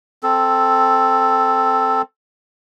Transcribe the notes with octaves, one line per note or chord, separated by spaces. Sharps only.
C4 A4